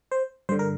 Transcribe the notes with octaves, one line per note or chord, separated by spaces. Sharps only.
C5
G2 D3 C5
A#4